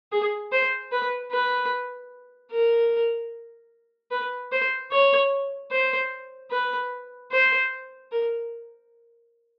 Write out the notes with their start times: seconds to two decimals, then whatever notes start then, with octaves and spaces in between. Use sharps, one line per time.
0.12 G#4
0.52 C5
0.92 B4
1.32 B4
2.51 A#4
4.11 B4
4.52 C5
4.91 C#5
5.71 C5
6.51 B4
7.31 C5
8.12 A#4